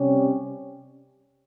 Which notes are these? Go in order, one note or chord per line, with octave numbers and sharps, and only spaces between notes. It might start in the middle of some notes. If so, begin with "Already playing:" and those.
Already playing: C3 G3 C#4 G4